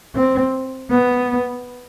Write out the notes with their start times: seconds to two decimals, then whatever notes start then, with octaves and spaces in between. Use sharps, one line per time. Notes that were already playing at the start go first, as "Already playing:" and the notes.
0.15 C4
0.91 B3